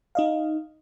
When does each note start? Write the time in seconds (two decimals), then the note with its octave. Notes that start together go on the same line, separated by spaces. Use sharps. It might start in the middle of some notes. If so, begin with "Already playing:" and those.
0.15 D#4 D#5 F5